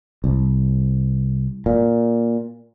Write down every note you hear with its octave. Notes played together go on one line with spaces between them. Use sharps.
C2
A#2